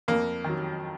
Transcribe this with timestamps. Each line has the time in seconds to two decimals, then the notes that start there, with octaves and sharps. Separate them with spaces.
0.08 F2 A#3
0.44 D#3 F#3